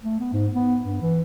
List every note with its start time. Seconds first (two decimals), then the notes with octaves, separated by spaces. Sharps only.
0.04 A3
0.20 B3
0.33 G#2
0.55 B3
0.83 G2
1.02 E3